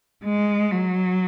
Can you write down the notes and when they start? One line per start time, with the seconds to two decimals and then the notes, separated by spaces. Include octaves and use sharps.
0.25 G#3
0.72 F#3